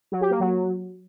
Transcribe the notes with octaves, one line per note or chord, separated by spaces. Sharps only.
F#3
G4
A#3
F#3